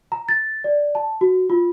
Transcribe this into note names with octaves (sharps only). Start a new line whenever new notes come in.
A#5
A6
D5
A5
F#4
F4